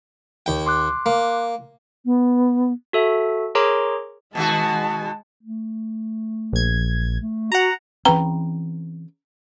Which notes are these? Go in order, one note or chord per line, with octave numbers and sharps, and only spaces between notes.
D#2 G5
C6 D6 F#6
A#3
B3
F#4 A4 E5
G#4 A#4 C#5 A#5 C6 D6
B2 D#3 G#3 F#4 A5
A3
A#1 G#6
A3
F#4 F#5 A#5
C#3 E3 C4 B4 G5 A#5